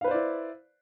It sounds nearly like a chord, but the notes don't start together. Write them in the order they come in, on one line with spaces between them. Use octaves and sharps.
F5 B4 C5 D5 E4